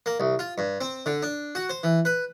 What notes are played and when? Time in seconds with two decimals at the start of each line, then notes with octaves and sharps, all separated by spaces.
0.06 A#3
0.20 C2
0.39 F4
0.58 G2
0.81 C4
1.06 D3
1.23 D4
1.55 F#4
1.69 C5
1.83 E3
2.05 B4